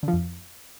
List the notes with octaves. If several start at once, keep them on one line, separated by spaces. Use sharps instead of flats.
D3
F3
F2